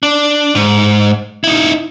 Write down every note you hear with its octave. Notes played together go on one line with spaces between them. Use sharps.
D4
G#2
D#4 E4